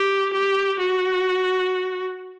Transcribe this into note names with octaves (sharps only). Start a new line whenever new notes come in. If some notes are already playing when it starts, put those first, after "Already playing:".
Already playing: G4
G4
F#4